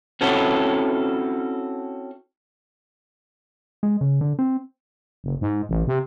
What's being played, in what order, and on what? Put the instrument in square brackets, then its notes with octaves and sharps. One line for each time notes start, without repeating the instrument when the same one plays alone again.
[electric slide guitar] C4 C#4 E4 F#4 A4
[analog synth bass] G#3
C#3
D3
C4
[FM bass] F#1
G#2
A1
C3